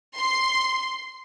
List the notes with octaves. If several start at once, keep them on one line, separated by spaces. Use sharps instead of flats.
C6